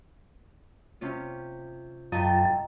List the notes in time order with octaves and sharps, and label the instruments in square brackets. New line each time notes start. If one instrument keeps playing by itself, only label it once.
[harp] C3 C#4 F4
[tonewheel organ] F#2 F4 A5 [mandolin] A3 C4 G4 [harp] D#5 A#5